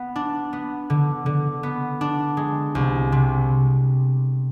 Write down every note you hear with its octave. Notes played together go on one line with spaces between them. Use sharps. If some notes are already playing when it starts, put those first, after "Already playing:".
Already playing: B3
D4
B3
D3
D3
B3
D4
G#3
C2
C3